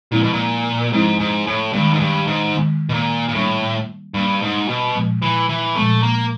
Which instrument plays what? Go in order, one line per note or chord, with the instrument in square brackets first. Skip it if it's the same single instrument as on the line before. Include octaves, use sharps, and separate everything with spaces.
[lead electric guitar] A#2 [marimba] F3 G#3 C4 E4
[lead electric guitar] B2
A#2
[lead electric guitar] G#2 [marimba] F3 G#3 C4 E4
[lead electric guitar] G#2
A2
[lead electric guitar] G2 [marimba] D#3 G#3 B3
[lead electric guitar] G#2
G2
G#2
[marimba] D#3 G#3 B3
[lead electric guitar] B2
A#2
A#2
[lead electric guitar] A2 [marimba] G3 A#3 D4
[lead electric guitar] G2 [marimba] G3 A#3 D4
[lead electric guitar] G#2
B2
[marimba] A#2 F3 G#3 B3
[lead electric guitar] E3
E3
[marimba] A#2 F3 G#3 B3 [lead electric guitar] A3
[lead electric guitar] A#3